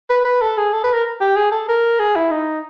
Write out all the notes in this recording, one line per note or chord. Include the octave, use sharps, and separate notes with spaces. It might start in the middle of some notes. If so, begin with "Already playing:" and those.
B4
B4
A4
G#4
A4
B4
A#4
G4
G#4
A4
A#4
G#4
E4
D#4